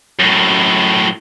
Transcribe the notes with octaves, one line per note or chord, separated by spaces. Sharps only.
F#2 A2